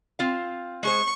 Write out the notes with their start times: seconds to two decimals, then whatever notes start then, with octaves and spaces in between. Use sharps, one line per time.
0.19 C4 F4 F5
0.83 G#3 G#4 C5 C#6